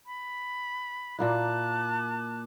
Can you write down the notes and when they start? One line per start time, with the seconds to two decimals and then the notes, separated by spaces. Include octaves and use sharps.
0.06 B5
1.18 A#2 A#3 E4 A5 D6 F#6